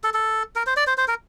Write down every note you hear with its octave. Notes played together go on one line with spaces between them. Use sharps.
A4
A4
A#4
C5
D5
C5
C5
A#4